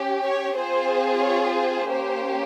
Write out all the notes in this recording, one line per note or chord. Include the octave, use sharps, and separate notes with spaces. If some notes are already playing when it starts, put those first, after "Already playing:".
Already playing: C#4 G4
C#5
C4 F4 G#4 C5
C#5
C5
A#3 C#4 G4